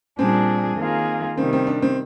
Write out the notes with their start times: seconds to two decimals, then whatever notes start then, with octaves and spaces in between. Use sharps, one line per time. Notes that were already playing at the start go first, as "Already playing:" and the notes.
0.19 A#2 G3 C4 D4 G#4
0.78 D#3 A#3 F4 G#4
1.37 C3 D#3 G3 C4
1.53 C4
1.67 D4
1.82 C4